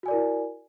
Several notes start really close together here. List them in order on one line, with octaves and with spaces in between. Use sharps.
F#4 G#5 D5 A#4 E4